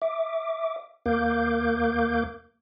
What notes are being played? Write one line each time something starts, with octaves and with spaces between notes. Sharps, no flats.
E5 D6
D#2 A#3 A#4 F5 D6 G6